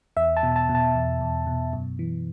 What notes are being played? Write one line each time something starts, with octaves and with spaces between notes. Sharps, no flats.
E2 E5
A5
B2
A5
B2
A5
E2
E2
B2
F#2
E3